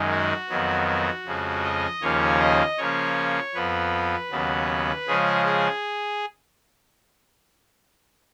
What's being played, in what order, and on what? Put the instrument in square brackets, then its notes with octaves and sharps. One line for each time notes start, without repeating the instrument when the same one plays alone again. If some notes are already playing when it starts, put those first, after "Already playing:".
Already playing: [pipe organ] F#2 D#3 G#3
F#4
F2 D#3 F#3 B3
F#4
F2 C#3 F3 G#3
D#5
D#2 C#3 F3 A#3 C#4 C#5
D#5
C#3 F3 A#3 C#4 C#5
F2 F3 B3 B4
D#2 C#3 F#3 B3
C#3 F3 G#3 C#4 G#4
G#4